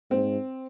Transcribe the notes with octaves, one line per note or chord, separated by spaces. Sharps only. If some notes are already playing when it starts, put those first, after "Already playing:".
G#2 C4